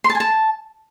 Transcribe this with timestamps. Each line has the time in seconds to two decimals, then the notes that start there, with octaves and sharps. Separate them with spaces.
0.04 C6
0.10 A5
0.15 G#5
0.20 A5